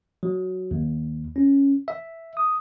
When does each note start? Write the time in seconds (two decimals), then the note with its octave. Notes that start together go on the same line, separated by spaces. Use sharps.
0.23 F#3
0.71 D#2
1.36 C#4
1.88 E5
2.37 D#6